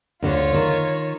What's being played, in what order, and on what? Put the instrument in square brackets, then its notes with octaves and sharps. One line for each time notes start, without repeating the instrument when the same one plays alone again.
[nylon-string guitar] D2 D3 [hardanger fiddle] F4 C#5
[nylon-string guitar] D#3